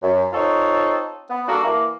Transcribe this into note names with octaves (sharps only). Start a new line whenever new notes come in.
F#2
C4 D#4 F4 A4 C#5
B3
G3 A#3 D4 F#4 A4
E3 A#3